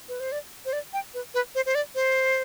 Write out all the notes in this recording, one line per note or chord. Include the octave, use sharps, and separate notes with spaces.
B4
C5
D5
C5
D5
G5
B4
B4
C5
C5
D5
C5